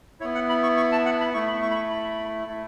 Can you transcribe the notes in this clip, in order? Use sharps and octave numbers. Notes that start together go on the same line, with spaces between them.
B3 E4 C#5
F#5
B5
C#6
C#6
A5
F#5
B5
A3 E4 C#6
B5
C#6
B5
C#6
B5
A3 E4